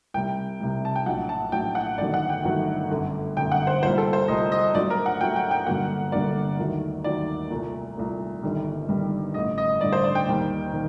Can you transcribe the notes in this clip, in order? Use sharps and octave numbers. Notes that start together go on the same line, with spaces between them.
C2 C3 G3 G5
C2 C3 G3
A5
G5
A#1 A2 F#3 F#5
A5
A#1 A2 F#3 G5
F#5
G1 G2 D#3 F#3 A3 D5
F#5
G5
G1 G2 D#3 F#3 A3
G1 F#2 D3 A3
G1 F#2 D3 A3 G5
F#5
C5
C2 A#2 G3 C5
A4
C5
C2 A#2 G3 D#5
D#5
G2 F#3 A3 D5
A#4
F#5
G2 F#3 A3 G5
G5
G5
G1 G2 D3 F#3 A#3 F#5
G1 G2 D3 F#3 A#3 D5
D#2 D#3 F#3 A3
D#2 D#3 F#3 A3 D5
C2 A#2 A3
C2 A#2 A3
G1 G2 D#3 G3
G1 G2 D#3 G3
A1 G2 D3 D#5
D#5
A1 G2 D3 D5
C5
D5
G5
D#2 D#3 G3 A#3
D#3